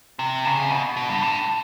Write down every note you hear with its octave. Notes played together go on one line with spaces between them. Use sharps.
C3
C#3
B2
B2
G2
A2